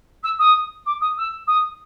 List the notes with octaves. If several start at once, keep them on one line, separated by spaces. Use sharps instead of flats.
E6
D#6
D6
D#6
E6
D#6